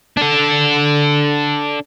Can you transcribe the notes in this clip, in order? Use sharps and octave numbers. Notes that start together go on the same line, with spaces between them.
D4 A4